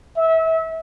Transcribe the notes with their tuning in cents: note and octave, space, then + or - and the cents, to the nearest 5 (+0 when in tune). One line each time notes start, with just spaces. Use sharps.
E5 -30